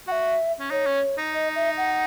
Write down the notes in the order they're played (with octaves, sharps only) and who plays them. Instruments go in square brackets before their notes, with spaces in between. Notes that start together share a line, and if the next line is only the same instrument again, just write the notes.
[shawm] F#4 [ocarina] F#5
[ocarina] E5
[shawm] C#4
[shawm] D#4 [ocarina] C#5
[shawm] C#4
D#4
[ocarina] D#5
E5
F#5